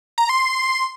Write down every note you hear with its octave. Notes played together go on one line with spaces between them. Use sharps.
A#5
C6